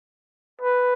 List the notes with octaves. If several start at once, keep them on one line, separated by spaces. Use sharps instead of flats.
B4